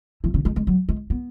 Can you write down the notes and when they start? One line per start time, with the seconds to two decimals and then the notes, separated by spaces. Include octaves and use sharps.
0.24 E3
0.34 C#3
0.45 G#3
0.56 G#3
0.67 F#3
0.89 G#3
1.10 B3